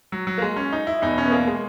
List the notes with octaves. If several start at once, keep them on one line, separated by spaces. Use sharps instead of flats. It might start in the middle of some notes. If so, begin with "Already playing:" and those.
F#3
F#3
A#3
G#3
C#4
D#4
E4
E2 B2 D#4
C#4
B3
A#3
G#3